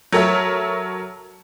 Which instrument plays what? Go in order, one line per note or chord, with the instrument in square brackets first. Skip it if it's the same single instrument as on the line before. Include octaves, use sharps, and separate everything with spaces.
[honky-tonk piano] F#3 A4 A#4 C#5 E5